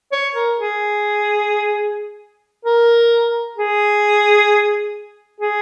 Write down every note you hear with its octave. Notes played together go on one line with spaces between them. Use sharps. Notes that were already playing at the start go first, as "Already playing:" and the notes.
C#5
A#4
G#4
A#4
G#4
G#4